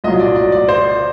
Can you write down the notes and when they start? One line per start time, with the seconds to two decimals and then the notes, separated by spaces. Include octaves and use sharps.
0.04 C2 A#2 F#3 D#5
0.20 D5
0.36 D5
0.52 D5
0.69 C5